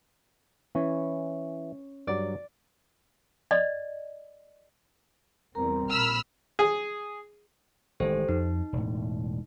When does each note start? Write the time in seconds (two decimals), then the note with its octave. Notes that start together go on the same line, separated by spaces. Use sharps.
0.75 E3 C#4
2.07 G2 F#3 D5
3.51 D5 D#5
5.55 E2 G3 C4 A#4 A#5
5.90 A#1 A#2 B5 E6 F6
6.59 G#4
8.00 A1 D#3 G#3 G4 A4 C5
8.29 F2 D#4
8.73 E1 A2